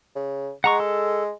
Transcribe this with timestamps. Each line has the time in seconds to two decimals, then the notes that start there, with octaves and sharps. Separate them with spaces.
0.15 C#3
0.64 G#3 F#5 A#5 C#6
0.80 A4